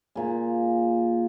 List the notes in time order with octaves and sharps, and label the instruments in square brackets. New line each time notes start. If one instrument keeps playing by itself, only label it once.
[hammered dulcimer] A#2 G#4